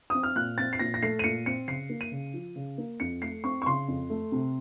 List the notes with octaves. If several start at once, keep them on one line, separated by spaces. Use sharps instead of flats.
C4 D#6
F6
A#2 F#6
C4 A6
C7
A#2 A#6
A#6
A3 C7
D#7
A#2 C#7
C4 C#7
C#3 C7
A#3
D#7
C#3
F3
C#3
A#3
F2 C#7
A3 C7
C4 C#6
C#6
C#3 C6
F2
A3
C3